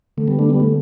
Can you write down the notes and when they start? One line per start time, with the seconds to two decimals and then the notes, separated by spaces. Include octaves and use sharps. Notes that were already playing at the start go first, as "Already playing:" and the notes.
0.17 D3 A3
0.28 G3 B3
0.39 A3 D4
0.49 G3 B3
0.60 A3